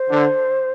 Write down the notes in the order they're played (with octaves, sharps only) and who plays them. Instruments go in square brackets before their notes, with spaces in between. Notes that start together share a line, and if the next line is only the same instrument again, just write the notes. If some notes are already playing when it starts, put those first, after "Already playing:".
Already playing: [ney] C5
[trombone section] D3